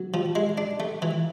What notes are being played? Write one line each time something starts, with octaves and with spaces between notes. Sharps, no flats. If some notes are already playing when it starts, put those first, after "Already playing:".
Already playing: F#3
F3
G#3
D4
A3
E3